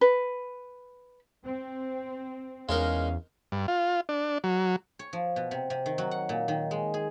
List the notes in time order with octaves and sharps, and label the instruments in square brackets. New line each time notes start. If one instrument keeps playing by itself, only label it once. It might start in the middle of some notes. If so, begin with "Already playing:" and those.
[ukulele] B4
[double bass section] C4
[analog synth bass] E2 [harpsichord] G#3 D#4 A#4 [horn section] C#4 F5
[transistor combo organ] G2
F4
D4
F#3
[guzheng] C#5
F3
B2
C3
C3
D#3
F#3
F#5
A#2
D#3
G#3
G#4